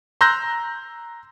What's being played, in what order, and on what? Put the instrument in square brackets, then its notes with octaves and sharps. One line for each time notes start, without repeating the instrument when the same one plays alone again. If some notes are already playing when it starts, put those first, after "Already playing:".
[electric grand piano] A#5 C6 E6 F#6 G6 A#6